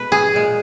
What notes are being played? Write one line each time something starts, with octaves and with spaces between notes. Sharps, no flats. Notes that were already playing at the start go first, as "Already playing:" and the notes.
Already playing: B2 G#3 B4
G#4
A#2 G#3